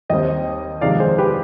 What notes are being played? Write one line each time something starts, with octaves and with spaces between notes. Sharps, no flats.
D#2 D#3 G3 C4 D#5 G5
F2 C3 D#3 G#3 D5 F5
G#4 C5
G4 B4